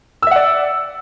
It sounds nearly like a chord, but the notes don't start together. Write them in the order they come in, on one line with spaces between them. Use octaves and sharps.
E6 E5 F#5 D5